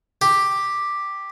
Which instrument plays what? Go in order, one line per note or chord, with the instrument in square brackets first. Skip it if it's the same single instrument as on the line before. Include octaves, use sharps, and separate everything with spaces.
[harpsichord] G4